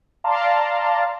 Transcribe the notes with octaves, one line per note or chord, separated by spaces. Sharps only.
D5 F5 A5 A#5 C6